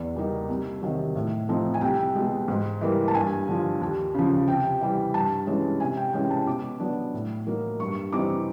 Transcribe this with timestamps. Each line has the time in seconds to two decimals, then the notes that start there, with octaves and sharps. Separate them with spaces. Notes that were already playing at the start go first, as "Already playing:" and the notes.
Already playing: E2 D5
0.15 B2 G3 A#3 D#4
0.49 C2
0.82 C3 D#3 F#3
1.15 A2
1.49 F3 A3 C4 D#4
1.74 G#5
1.81 C2 G5
2.15 B2 G#3
2.48 G#2
2.81 E3 G3 A#3
3.08 A5
3.15 G2 G#5
3.48 D3 F3
3.81 D#2
4.15 C#3 F3
4.48 C3 G5
4.81 E3 G3
5.14 G2 A5
5.47 E3 G#3 C#4
5.80 C3 G#5
5.97 G5
6.13 E3 G#3 C#4 G5
6.31 A5
6.47 B2 D6
6.80 F#3 B3 D4
7.14 A2
7.47 F#3 A#3 D#4
7.79 G2 C#6
8.12 E3 G3 C4 D#4 D6